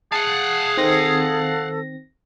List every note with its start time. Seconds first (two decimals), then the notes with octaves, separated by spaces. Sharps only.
0.12 G#4 F5 F#5 A5
0.77 D#3 C4 A4 A#6